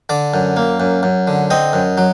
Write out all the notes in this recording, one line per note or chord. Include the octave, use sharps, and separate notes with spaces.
D3 D5
F#2
A#3
F#2
F#2
D3
C4 D#5
F#2
F#3